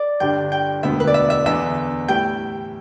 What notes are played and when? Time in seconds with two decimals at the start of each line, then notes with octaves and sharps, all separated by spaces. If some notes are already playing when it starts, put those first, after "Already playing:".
Already playing: D5
0.20 G1 G2 G3 D4 G5
0.52 G5
0.83 E1 D2 D3 B3 E5
1.00 B4
1.07 D5
1.14 E5
1.30 E5
1.46 E2 D3 B3 D4 E5
2.08 A2 G3 E4 G5